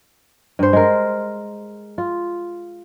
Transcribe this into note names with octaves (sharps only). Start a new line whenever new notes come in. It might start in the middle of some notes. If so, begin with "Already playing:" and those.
G2 C5
G#3 A#4
F4